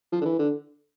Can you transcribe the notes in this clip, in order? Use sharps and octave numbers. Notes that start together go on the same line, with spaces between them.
F3
D3
E3
D3